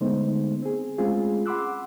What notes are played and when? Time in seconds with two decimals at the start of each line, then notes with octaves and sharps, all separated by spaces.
0.01 D3 G#3 A3 B3 D#4 C5
0.62 C4 G#4
0.98 G#3 A3 C4 C#4 F4 G#4
1.46 F#5 B5 C6 D6 E6 F#6